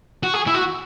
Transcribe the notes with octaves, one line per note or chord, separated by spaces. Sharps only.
F#4
G#4
E4
F#4